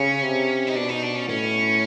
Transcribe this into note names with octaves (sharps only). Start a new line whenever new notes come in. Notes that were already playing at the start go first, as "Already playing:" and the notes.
Already playing: C#3 C#4
C3
D#4
B2 D4
D#4
D4
C#4
A2 C#4